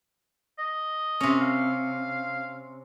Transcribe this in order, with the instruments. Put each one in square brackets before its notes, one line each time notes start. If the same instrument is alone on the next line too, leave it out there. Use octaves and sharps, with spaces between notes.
[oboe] D#5
[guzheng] C3 C#4
[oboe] F5